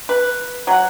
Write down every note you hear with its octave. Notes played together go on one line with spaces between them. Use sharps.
B4
F#3 F#5